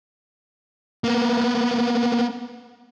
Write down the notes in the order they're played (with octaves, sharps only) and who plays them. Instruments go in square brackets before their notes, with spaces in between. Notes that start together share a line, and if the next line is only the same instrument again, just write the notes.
[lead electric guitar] A#3 B3